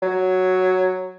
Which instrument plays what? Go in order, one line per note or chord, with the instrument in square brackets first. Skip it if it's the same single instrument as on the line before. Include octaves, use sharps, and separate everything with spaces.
[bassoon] F#3